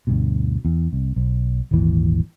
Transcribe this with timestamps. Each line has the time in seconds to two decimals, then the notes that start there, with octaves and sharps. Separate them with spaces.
0.07 D2 G2 B2
0.65 E2
0.93 C2
1.16 B1
1.71 D#1 G#1 D#2 E3